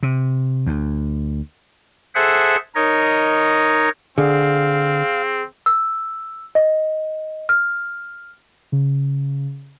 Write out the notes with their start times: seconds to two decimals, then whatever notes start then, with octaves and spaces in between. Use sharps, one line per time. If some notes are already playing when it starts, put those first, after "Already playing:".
0.03 C3
0.67 D2
2.15 G#4 A4 C5 E5 F#5
2.75 D#4 A#4 C#5 D#5
4.18 D3 C4 G#4 F5
5.66 E6
6.55 D#5
7.49 F6
8.72 C#3